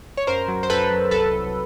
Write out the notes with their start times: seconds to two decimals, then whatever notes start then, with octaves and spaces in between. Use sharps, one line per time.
0.17 C#5
0.27 F#2 A#4 C5
0.48 F#3
0.63 C5
0.70 F#2 A4 B4
0.90 F#3
1.11 C2 A4 B4
1.32 C2